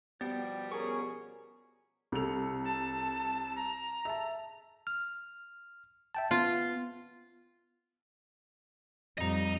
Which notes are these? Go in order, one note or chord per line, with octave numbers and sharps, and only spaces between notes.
B2 F3 G3 B3 D5 G5
C#4 G#4 A#4 C#6
C2 A4 F7
A5
A#5
E5 A5
F6
E5 G5 A5
B3 F4
F2 G3 D#5 A#5